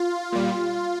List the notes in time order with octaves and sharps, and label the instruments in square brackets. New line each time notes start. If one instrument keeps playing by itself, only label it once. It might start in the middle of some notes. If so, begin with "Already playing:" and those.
Already playing: [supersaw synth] F4
A#2 G3